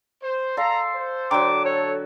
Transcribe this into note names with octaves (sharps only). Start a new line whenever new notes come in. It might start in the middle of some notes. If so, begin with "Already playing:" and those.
C5
A4 D5 F5 A#5 C6
C5
D3 F#3 G5 A#5 C6 D6
A4 C#5